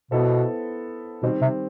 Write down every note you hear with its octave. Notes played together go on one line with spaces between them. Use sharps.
B2 B3 E4 A4 C5
B2 D#3 G3 C4
C3